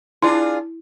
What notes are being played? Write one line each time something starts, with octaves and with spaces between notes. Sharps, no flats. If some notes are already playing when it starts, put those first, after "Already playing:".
D4 E4 F4 G#4